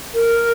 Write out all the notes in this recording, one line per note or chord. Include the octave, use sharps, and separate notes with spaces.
A#4